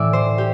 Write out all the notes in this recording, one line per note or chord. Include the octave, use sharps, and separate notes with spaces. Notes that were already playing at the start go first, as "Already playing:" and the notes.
Already playing: A2 E3 D5 E5
C5
G4